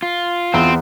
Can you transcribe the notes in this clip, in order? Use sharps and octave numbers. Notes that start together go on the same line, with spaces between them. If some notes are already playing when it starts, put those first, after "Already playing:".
F4
E2 C4